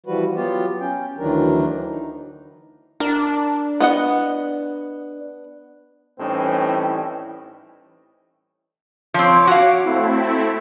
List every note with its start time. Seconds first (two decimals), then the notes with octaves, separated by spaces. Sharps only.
0.06 E3 F3 G3 F#4 B4
0.36 F#3 B3 F4 G4
0.80 C#4 G5
1.18 D2 D#3 E3 F#3 D4 A#4
1.88 D#4
3.00 D4 A#4
3.80 B3 D#5 F#5
6.19 A2 E3 G3 C4 C#4 D#4
9.14 F3 C4 C#5 D6
9.47 F#4 F5
9.84 A3 C4 E4